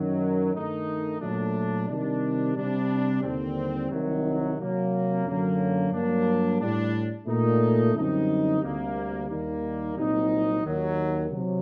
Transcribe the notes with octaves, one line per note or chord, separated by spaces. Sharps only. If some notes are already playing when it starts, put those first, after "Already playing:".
Already playing: F#2 D#3 F#3
G2 D#3 A3 D#4
A#2 F#3 A3 D4
C3 D#3 G3 D4
C3 G3 D4
D#2 D3 G3 C4
C2 C3 D#3 F#3
C3 F#3 A#3
F#2 D3 F#3 A#3
G2 F#3 A#3 D4
A2 G3 D4
A#2 A3 D#4
F#2 D3 G3 C4 D#4
D2 C3 G3 A#3
D#2 D#3 G3 A#3
C2 A#2 F#3 C4 D#4
D#2 D#3 F#3
C3 F#3